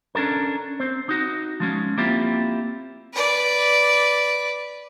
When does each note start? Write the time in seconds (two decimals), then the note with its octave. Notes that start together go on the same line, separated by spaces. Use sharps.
0.15 C#4 D4 F4 A4 A#4
0.80 C4 C5
1.09 D#4 F#4
1.60 F3 G#3 C#4
1.98 A#3 C4 E4 F4 G4
3.14 B4 D5